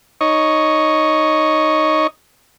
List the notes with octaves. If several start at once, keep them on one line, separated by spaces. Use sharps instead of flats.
D#4 C#5 D#5 C#6